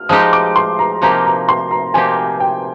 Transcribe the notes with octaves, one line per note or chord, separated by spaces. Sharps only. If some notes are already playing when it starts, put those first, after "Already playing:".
Already playing: F6
F3 G#3 D#4 G4 D#6
D6
C6
A#5
C3 F3 A#3 D#4 G4 A#5
A#5
C6
A#5
C3 F3 A#3 D#4 G4 G#5
G5